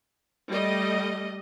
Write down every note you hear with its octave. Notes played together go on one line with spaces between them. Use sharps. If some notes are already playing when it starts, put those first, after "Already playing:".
G3 A3 D#5